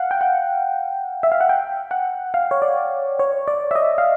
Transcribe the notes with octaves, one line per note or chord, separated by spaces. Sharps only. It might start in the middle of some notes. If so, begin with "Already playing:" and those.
Already playing: F5 F#5
G5
F#5
E5
F5
F#5
G5
F#5
F5
C#5
D5
C#5
D5
E5
D#5
F5